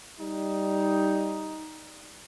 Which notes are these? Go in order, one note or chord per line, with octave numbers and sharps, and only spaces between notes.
G3 D#4